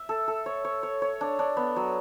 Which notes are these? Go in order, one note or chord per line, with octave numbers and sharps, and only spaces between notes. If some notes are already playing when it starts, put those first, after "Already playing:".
Already playing: E5
A4
A4
C#5
C#5
C#5
C#5
D4
D4
B3
F#3